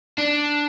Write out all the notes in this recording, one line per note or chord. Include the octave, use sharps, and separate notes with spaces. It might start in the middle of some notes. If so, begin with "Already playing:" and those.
D4